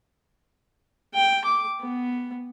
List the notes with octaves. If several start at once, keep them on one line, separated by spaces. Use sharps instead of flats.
G5
D6
B3